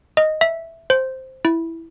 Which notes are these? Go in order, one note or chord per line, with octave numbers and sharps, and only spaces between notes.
D#5
E5
C5
E4